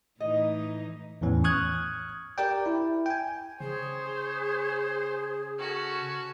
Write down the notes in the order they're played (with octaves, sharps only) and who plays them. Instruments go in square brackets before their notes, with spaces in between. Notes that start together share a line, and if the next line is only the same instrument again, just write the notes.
[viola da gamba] A2 E3 D#4 [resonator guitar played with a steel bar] D#5
[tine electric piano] E2 A2 E3 C#4
C#6 D#6 F6 F#6 G#6
G4 A#4 D5 G5
E4
G5 G#5
[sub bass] C#3 [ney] G#4 [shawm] C5 [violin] C#5
[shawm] C#4 [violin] F#4 A4